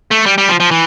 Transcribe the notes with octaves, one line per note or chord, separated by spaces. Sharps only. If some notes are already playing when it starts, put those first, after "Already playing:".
A3
G3
G3
F3
F3
E3